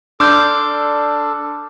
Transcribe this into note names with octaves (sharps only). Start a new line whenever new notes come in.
D4 A4 C6 D6 E6 F6 G6